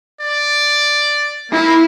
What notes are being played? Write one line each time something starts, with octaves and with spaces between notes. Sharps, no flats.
D5
A#3 E4